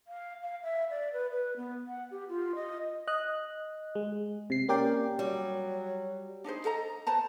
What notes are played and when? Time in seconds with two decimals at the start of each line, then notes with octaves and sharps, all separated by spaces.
0.07 F5
0.42 F5
0.63 E5
0.90 D5
1.13 B4
1.31 B4
1.57 B3
1.87 F#5
2.11 G4
2.29 F4
2.55 D#5
3.07 D#5 F#6
3.95 G#3
4.50 C3 C7
4.69 A#3 C#4 G4 A#4 D5 G5
5.19 F#3 G3
6.44 D4 D#4 G#4 C5
6.65 A4 D#5 A#5
7.07 B4 C5 A5 A#5